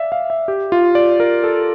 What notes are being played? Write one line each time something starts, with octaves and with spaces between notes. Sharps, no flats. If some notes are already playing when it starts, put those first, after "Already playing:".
Already playing: D5 E5 F5
F5
E5
G4
F4
D5
A#4
A4